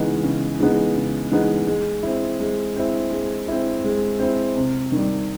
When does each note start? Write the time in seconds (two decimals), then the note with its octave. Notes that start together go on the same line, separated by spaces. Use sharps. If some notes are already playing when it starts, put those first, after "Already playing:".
Already playing: C#3 E3 G#3 B3 D#4
0.23 C#3
0.59 E3 G#3 B3 D#4
0.96 C#3
1.31 E3 G#3 B3 D#4
1.67 G#3
2.03 C4 E4
2.40 G#3
2.76 C4 E4
3.11 G#3
3.48 C4 E4
3.84 G#3
4.19 C4 E4
4.57 C3
4.92 D#3 G3